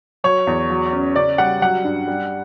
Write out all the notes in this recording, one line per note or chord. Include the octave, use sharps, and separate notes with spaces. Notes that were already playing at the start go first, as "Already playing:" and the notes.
F#3 C#5
E2
F#3
C#4
C#3 D5
G3 F#5
F#3 F#5
G2
G3